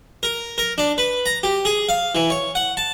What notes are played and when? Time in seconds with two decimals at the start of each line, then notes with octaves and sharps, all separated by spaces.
0.23 A#4
0.58 A#4
0.78 D4
0.98 B4
1.26 A#5
1.43 G4
1.65 G#4
1.89 F5
2.15 E3
2.30 C#5
2.55 F#5
2.77 A5